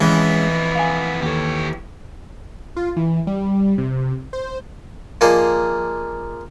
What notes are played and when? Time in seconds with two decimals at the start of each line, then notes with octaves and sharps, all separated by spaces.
0.01 F2 E3 G#3 B3 C#4
0.75 F5 G#5
1.22 D#2 G4 A4 C#5
2.76 F4
2.96 E3
3.27 G3
3.78 C3
4.33 C5
5.21 F3 A#3 D#4 G#4 C5 D5